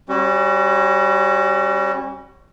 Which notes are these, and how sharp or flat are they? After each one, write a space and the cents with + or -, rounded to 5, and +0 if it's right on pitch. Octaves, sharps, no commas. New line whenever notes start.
G3 +0 C#4 -30 F#4 +25